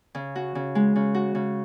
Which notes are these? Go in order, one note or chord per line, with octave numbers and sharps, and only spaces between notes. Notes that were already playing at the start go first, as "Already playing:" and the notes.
C#3
F#4
C#3
G#3
C#3
F#4
C#3